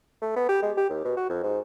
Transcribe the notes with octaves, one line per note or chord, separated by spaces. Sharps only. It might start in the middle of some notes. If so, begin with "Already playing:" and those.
A3
B3
G4
G#3
G4
D#2
B2
F#4
F2
G#2